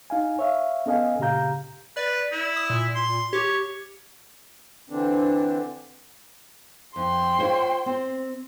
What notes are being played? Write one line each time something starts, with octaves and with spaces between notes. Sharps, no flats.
D#4 F5 G#5
C#5 E5 F5
B3 C#4 A4 D#5 F5 G#5
A#2 C#3 G4 F5 A#5 G6
B4 D5
E4
D#6
A#2
C6
G4 C#5
D3 E3 C4 D4
F2 G5 C6
F4 C5 C#5
C4